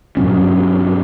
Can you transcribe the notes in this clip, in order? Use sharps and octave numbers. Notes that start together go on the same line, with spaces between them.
G2 B2 F#3 C#4